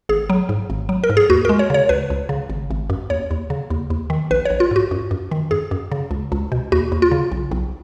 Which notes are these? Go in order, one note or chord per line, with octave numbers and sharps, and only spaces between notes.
G#1 G#4
F#3
G#2
G#1
F#3
A#4
G#2
G#4
D#2 F#4
G#3 A#4
C#5
C#3 C#5
C#2 B4
C#2
C#3
G#1
G#1
F#2
D#2 C#5
D#2
C#3
D#2
D#2
D#3
A#1 B4
A#1 C#5
F4
G#2 F#4
F#2
F#2
D#3
F#2 G#4
F#2
C#3
C#2
C#2
B2
D#2 F#4
D#2
F4
C#3
B1
B1